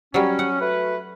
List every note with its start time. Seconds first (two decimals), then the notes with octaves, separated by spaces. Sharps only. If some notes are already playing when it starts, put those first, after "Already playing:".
0.14 F#3 G3 C#4
0.39 F#5
0.60 A3 F#4 B4